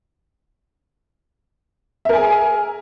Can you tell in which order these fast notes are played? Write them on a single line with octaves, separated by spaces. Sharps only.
E5 A#4 G#5 G#4